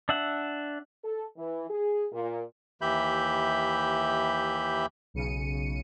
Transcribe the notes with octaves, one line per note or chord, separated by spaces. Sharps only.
D4 E5 F#5
A4
E3
G#4
A#2
D#2 E3 G4 E5 B5 G6
B1 C#3 C#7 D#7